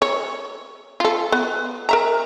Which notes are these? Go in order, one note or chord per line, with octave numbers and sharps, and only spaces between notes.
C#5
F4 A4
B3
A#4 E5 A#5